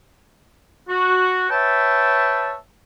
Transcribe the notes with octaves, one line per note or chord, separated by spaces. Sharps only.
F#4
B4 C#5 E5 G5 A5